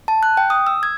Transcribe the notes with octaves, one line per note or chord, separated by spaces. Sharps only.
A5
F#6
G5
D#6
E6
G#6